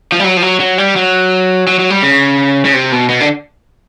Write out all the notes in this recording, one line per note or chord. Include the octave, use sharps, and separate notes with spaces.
F3
G3
F#3
F3
F#3
F#3
G3
F#3
F#3
F#3
G3
C#3
C#3
C3
B2
B2
D3